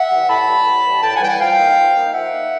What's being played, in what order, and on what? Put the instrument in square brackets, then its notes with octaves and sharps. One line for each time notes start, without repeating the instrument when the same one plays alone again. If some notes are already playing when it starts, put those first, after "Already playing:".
Already playing: [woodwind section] E5 F#5
E3 G3
A2 A5 B5
E3 G3
A2
E3 G3
A2 G5 A5
F#5 G#5
E3 G3 G5
F#5 G#5
F3 F5 G5
A#3 D#4
F3
A#3 D#4
G5
F3 E5 F#5
A#3 D#4